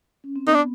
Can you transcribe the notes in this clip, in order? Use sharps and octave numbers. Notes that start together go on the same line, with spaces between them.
C#4
C4
B3 D#4
D4